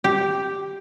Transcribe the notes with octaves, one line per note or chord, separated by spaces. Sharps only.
G4